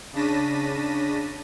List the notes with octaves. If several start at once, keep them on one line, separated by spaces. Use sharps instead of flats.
C#3 D4 A5 A#6 B6 D#7